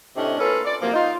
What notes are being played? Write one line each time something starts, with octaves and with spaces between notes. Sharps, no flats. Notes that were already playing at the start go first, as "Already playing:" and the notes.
A2 C3 A3 C#4 D4 D#5
A#3 C#4 E4 F4 A4 B4
D5
C3 F3 F#3 A#3
D#4 F4